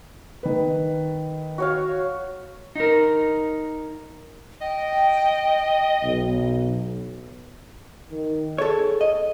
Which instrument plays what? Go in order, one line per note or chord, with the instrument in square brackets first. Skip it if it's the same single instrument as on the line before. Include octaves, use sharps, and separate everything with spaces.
[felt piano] D#3 B4
[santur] F#4 C#5 F5
[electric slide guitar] D#4 A#4
[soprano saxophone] D#5 [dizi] G5
[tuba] B1
[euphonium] D#3
[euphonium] G#4 [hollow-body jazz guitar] A4 C#5
[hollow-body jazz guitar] D#5